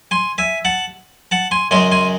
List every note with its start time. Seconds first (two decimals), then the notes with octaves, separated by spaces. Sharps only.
0.11 G#5 C6
0.38 E5 G#5
0.65 F#5 A5
1.31 F#5 A5
1.51 G#5 C6
1.71 F#2 C#3 G#3 G#5 C6
1.92 G#5 C6